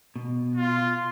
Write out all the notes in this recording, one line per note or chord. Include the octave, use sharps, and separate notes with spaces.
B2
F4